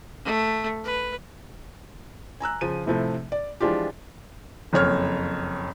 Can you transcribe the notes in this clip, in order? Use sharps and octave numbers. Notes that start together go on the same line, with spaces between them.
A3
B4
G#5 A#5 E6 F#6
C#3 F3 D#7
A2 C3 F3 A3
D5
E3 F3 G#3 D4 F4 G4
F#1 F2 C#5 F6